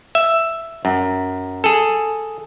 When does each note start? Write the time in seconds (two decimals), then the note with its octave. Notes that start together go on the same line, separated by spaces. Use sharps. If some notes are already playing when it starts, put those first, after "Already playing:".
0.15 E5
0.85 F#2
1.64 G#4 A4